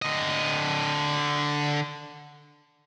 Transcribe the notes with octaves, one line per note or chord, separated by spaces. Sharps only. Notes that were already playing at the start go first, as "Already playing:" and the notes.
D3 D#5